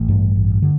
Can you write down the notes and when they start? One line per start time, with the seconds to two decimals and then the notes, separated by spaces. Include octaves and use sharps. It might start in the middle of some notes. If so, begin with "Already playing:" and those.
Already playing: A1 A3
0.09 G2
0.35 A1
0.62 D3